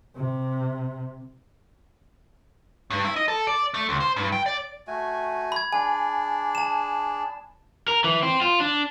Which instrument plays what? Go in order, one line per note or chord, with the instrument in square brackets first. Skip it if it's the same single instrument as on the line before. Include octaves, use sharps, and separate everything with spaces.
[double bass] C3
[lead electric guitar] G2
E4
D#5
A4
D5
A3
C#2
C5
G2
G5
D5
[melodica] A3 F#4 G#5
[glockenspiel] B5 G#6
[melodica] D4 G#4 D5 [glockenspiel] G#5
[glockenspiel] A5 E7
[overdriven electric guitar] A#4
E3
C4
F4
D4